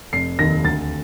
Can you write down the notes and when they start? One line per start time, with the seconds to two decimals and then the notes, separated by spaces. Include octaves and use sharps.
0.13 F1 C7
0.39 D#2 D#3 A#6
0.64 D2 A6